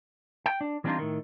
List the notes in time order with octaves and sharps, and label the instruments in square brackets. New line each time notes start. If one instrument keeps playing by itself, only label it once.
[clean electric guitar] G5
D4
E3 G3 C4 D4 D#4 F4
A2 D#3